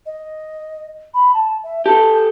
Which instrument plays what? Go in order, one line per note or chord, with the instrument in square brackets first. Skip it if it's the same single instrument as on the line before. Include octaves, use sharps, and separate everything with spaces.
[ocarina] D#5
B5
A5
E5
[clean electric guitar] G4 A4 [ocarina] A5